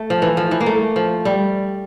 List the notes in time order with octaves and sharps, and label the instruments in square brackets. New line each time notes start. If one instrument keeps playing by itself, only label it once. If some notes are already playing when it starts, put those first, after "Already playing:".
Already playing: [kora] A3
F3
E3
F3
E3
A#3
A3
F3
G3